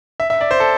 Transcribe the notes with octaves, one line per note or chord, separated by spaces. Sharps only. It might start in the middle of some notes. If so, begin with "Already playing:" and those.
E5
E5
D5
C5
A4